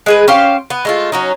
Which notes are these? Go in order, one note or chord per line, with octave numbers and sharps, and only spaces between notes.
G#3 G#4 B4
C#4 G4 C5 F5
B3
G#3 A3 F4
F#3 C#4 D#4